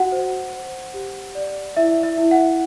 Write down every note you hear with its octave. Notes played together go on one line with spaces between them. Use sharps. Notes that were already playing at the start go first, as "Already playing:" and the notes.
Already playing: F#4 F#5
C5
C5
G4
D5
E4 E5
E5
E4
F#5